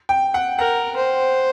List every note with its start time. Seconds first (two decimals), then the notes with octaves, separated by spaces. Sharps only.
0.09 G5
0.34 F#5
0.59 A#4 F#5
0.97 C5